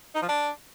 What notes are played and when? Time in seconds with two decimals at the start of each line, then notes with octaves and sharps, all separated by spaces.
0.15 D#4
0.22 F3
0.28 D4